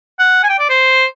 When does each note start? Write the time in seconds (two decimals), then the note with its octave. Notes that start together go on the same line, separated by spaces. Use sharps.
0.19 F#5
0.44 G#5
0.49 G5
0.59 D5
0.69 C5